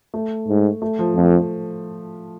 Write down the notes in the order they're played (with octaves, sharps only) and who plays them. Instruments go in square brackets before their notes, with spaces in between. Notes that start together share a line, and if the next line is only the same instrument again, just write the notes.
[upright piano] A3
[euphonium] G#2
[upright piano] A3
F3
[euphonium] F2